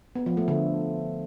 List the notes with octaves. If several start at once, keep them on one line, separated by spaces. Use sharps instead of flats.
B3
F3
A3
D3